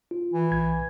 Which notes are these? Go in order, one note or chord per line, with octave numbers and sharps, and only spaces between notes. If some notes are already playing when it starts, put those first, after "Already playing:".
F4
E3
B1 G#6